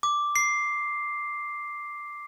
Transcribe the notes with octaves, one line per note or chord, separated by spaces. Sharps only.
D6
C7